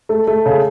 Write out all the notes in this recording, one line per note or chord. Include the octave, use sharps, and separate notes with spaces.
A3
A3
C#3